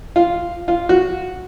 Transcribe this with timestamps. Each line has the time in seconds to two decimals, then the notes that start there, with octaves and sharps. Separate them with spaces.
0.16 F4
0.68 F4
0.89 F#4